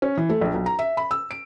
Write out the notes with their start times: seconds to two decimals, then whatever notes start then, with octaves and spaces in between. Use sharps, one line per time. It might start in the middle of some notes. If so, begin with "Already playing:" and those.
0.02 C#4
0.17 E3
0.29 A3
0.41 A#1
0.54 B1
0.66 A#5
0.79 E5
0.97 B5
1.11 E6
1.31 D7